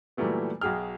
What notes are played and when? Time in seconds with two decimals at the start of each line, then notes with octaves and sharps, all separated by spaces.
0.17 A#2 E3 F#3 G3 A3 B3
0.61 B1 F#4 G#4 G5 F6